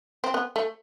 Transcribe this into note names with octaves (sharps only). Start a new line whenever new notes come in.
C4
B3
A3